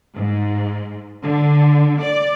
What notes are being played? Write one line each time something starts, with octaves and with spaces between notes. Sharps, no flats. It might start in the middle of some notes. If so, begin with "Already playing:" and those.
G#2
D3
D5